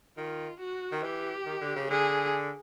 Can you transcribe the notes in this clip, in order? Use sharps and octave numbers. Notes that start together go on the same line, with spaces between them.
D#3 F4
F#4
D#3
E3 G4
D#3
D3
C#3
D3 G#4